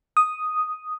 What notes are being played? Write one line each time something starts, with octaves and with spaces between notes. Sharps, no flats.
D#6